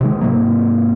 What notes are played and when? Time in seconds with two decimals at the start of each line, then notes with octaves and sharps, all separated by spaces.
0.01 C3 D#3 G#3
0.21 G#2 C3 F#3 A#3